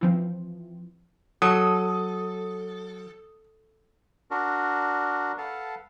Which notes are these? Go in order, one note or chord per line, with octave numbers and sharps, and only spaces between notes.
E3 F3 C4
F#3 A4 D#6
D4 F#4 A#4
A4 B4 F5 F#5 A5